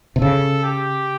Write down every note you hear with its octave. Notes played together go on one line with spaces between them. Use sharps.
C3
C#3 A4
G4